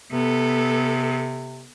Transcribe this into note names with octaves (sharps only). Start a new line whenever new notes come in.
C3 B3 A4